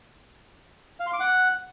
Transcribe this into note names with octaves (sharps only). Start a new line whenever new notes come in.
F5
C6
D6
F#5